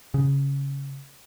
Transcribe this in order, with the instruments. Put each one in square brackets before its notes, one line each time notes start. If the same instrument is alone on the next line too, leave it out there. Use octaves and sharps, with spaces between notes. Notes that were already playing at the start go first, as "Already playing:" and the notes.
[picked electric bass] C#3